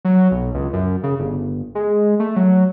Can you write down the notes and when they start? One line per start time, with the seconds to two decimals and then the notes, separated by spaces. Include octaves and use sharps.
0.05 F#3
0.31 B1
0.54 C#2
0.73 F#2
1.03 C#3
1.19 G1
1.75 G#3
2.20 A3
2.36 F#3